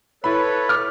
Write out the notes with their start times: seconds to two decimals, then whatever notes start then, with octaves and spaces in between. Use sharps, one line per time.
0.24 E4 A4 B4 C#5 B5
0.69 D6 F6